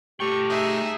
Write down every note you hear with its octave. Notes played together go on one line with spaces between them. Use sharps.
A3 G4 G5 C#6
D#4 G#4 E5